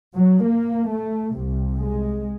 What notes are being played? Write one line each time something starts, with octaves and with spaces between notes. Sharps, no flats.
F#3
A#3
A3
C2 C3
G#3